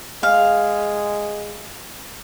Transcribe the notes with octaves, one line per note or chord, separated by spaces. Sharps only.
G#3 F5